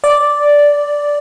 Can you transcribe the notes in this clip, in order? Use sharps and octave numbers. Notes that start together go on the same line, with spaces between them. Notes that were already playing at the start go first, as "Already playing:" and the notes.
D5